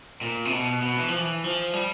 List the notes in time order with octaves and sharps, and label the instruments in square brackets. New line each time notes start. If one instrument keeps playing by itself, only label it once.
[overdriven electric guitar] A#2
C3
B2
B2
E3
F3
E3
F3
G3